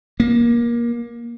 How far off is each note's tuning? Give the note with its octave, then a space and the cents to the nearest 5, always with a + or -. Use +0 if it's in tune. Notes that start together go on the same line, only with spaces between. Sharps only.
A#3 +25